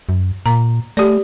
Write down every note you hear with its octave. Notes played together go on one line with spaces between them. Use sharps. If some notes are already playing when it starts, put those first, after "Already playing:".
F#2
A#2 A#5
A3 G4 D5